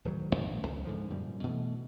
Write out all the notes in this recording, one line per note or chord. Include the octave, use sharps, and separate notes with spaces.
D1 G2 D#3 F#3
A#1 A2 F#3 C#4
D1 C#2
G#2 D3 F3
F#2 A#2 G3
B2 E3 A3